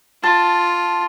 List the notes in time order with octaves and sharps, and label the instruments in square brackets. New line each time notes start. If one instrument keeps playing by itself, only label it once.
[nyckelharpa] F4 [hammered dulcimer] A5